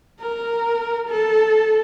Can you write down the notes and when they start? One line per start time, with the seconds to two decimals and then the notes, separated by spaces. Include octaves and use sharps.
0.20 A#4
1.09 A4